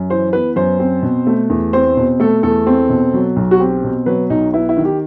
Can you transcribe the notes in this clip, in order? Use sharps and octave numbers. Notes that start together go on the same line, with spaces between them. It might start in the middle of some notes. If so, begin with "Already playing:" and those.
Already playing: F#2
E3 C5
B3 B4
F#2 C5
C4
B2
A3
E2
C4 C5
B2
A3 A4
E2 A4
C4
B2
F#3
B1
F#4
C4 G4
B2
F#3 B4
B1 D#4
B3 E4
E4
D#3
G4